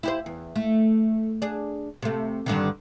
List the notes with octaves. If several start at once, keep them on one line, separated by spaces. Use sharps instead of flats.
E4 G4 C5
E2
A3
D4 G#4
C3 A3
G2 D3 D#3